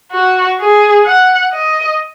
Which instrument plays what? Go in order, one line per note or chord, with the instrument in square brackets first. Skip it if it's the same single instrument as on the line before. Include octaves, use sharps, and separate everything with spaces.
[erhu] F#4
G#4
F#5
D#5